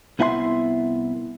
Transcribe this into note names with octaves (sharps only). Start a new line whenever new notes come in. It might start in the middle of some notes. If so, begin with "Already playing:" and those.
C2 B3 E4 E5 F#5 C6